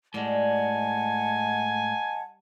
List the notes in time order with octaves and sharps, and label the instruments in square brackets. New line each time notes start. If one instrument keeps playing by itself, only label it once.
[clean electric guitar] A2 G#3 [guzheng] G3 D5 [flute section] D#5 F#5 A5 [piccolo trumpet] G#5